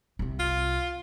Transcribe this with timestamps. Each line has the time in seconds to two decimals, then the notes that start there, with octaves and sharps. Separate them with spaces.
0.19 C2 C3
0.39 F4